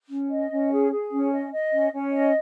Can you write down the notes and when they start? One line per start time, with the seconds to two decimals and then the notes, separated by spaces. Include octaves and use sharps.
0.10 C#4
0.30 D#5
0.51 C#4
0.71 G#4
0.91 G#4
1.12 C#4
1.32 D#5
1.52 D#5
1.73 C#4
1.93 C#4
2.13 D#5